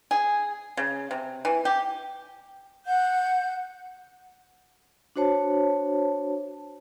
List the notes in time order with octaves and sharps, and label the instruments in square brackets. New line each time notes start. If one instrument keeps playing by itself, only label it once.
[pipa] G#4
C#3
C3
E3
G4
[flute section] F#5 G6
[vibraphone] D4 F#4 C5 C#5 A5